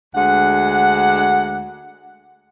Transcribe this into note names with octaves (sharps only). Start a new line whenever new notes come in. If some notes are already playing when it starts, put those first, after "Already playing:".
D2 G#3 D4 F#5